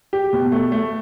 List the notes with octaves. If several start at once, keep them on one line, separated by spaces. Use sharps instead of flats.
G4
B2
A3
A3